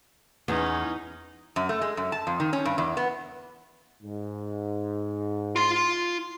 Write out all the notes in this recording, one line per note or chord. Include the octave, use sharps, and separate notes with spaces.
E2 C#4 D#4
F#2
A3
G#3
F#2
A5
F2
D#3
C#4
G2
E2
B3
G#2
F4 C6